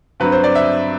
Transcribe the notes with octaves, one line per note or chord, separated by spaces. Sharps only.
G2 F#3 C4 B4
C5
D5
E5